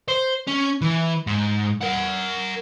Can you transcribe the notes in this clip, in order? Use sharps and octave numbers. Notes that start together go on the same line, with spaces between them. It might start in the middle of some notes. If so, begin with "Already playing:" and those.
C5
C#4
E3
G#2
A#4 F#5